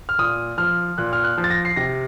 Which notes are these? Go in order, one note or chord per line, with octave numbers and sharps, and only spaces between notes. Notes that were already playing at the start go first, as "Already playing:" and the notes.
F6
A#2 D#6
F3 F6
A#2 F#6
F6
F#6
F3
A6
A#6
C7
C3 A#6